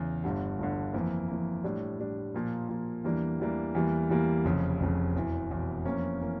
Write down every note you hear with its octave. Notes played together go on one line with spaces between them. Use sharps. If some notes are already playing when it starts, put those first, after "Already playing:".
Already playing: E2 C#3
G1 G2 D3
G1 G2 D3
F2 E3 A#3
F2 E3 A#3
A2 G3 D4
A2 G3 D4
A#2 F3 A#3
A#2 F3 A#3
E2 E3 G3 A#3 D4
E2 E3 G3 A#3 D4
E2 E3 G3 A#3
E2 E3 G3 A#3
F1 F2 C#3
F1 F2 C#3
E1 E2 E3
E1 E2 E3
F2 E3 A#3 C#4
E3 A#3 C#4